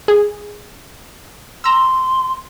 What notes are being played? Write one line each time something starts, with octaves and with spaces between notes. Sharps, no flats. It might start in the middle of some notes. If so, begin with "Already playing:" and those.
G#4
A#5 C6 E6